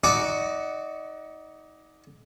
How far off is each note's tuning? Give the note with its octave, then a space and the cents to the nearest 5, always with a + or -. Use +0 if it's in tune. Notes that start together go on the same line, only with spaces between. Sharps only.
D#4 +20 F#4 +0 D5 +0